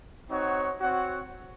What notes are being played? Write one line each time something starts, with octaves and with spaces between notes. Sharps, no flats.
C4 D#4 F#4 C#5 F#5
C4 F#4 C#5 F#5